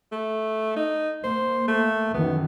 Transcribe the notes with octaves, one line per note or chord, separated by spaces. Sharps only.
A3
D#4
A#3 C5
A3
F#2 D#3 E3 B3